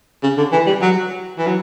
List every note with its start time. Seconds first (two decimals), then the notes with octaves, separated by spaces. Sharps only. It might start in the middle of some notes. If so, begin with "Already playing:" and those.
0.23 C#3
0.37 D3
0.52 E3
0.66 G3
0.81 F#3
1.38 E3
1.47 F#3